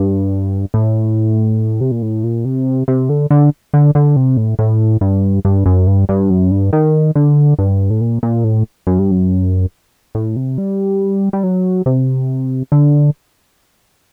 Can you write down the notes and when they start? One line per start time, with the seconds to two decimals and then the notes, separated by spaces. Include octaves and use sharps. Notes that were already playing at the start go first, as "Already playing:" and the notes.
Already playing: G2
0.74 A2
1.81 C3
1.91 A#2
2.02 A2
2.24 A#2
2.45 C3
2.88 C3
3.09 D3
3.30 D3
3.74 D3
3.95 D3
4.16 C3
4.37 A2
4.59 A2
5.01 G2
5.45 G2
5.66 F#2
5.87 G2
6.09 G2
6.30 F#2
6.51 G2
6.73 D#3
7.15 D3
7.59 G2
7.90 A2
8.01 A#2
8.23 A#2
8.44 A2
8.87 F#2
8.99 G2
9.11 F#2
10.15 A2
10.36 C3
10.58 G3
11.33 G3
11.43 F#3
11.86 C3
12.72 D3